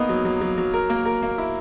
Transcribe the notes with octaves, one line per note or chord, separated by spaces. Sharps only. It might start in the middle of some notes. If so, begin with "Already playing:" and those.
Already playing: A#3 B3 D#4
F#3
F#3
F#3
F#3
A#4
A#3
A#4
A#3
E4